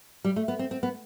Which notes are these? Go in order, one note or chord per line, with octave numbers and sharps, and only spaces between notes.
G3
A3
B3
C4
C4
B3